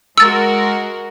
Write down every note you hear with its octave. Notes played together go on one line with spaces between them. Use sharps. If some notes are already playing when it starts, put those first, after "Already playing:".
G#3 F#4 A#4 E6 A6